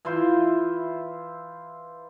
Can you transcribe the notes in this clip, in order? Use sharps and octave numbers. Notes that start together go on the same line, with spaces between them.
E3 E4 F4 C5